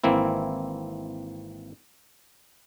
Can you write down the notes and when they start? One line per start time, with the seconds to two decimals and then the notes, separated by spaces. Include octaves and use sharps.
0.04 G#1 E3 A#3 C4 E4